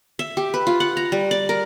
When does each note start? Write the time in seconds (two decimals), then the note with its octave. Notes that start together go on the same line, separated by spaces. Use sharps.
0.19 E5
0.37 G4
0.54 B4
0.67 F4
0.80 F#5
0.97 A#5
1.12 G3
1.31 D5
1.49 A#4